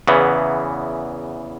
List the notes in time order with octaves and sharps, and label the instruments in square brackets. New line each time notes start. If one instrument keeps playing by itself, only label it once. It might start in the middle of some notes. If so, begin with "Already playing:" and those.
[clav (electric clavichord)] E2 C#3 E3 B3